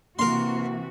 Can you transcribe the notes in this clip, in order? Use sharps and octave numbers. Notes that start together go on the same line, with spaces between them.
C3 E3 A#3 F#4 A#4 C6